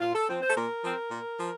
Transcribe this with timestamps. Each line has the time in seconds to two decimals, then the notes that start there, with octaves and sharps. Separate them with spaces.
0.01 A#2 F4
0.15 A4
0.29 F3 C4
0.42 C5
0.50 A4
0.56 A#2 A#4
0.84 F3 C4
1.11 A#2
1.39 F3